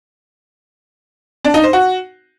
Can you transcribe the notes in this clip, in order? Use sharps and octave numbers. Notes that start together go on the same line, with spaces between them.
D4
D#4
C5
F#4